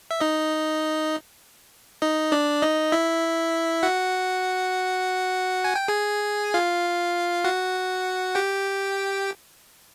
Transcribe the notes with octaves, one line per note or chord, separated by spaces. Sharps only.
E5
D#4 D#5
D#4 D#5
D4 D5
D#4 D#5
E4 E5
F#4 F#5
G#5
G5
G#4 G#5
F4 F5
F#4 F#5
G4 G5